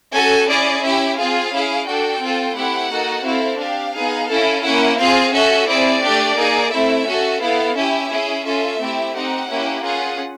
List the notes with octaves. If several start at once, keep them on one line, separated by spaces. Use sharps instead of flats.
C#4 F#4 A4 G#5
C#4 E4 G#4 D5
C#4 E4 G4 E5
C4 F4 G#4 F5
C#4 E4 G#4
D4 F#4 A4 G5
C4 F4 A4
A3 C4 E4 G4 F#5
A#3 D#4 F#4 A4
C4 E4 A4 F5
D4 G4 F5
B3 D#4 G#4
C#4 E4 A4
A#3 C#4 E4 F#5
C4 F4 G#4 F5
C#4 F#4 A4 E5
C4 E4 G#4 D5
A3 D4 G4
A#3 D#4 G#4
A3 C4 E4 E5
C#4 F#4 A4
B3 E4 A4 F5
C#4 E4 G4 E5
C#4 E4 G#4
C#4 F4 A4 E5
A3 C4 E4 G4
C4 D#4 G4 F#5
A#3 C#4 E4 G4
C#4 F4 G#4 F#5